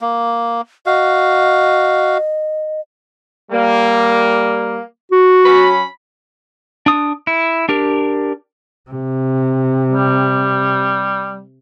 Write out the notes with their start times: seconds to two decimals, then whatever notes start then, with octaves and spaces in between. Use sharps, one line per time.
0.01 A#3
0.86 F#4 D#5 F5
3.51 G3 A#3
5.11 F#4
5.44 F#3 C#4 B5
6.86 D4 D#6
7.27 E4
7.69 D4 G4 A#4
8.90 C3
9.91 G3